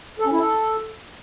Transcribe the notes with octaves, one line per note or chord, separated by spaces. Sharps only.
A4
C#4
E4
A4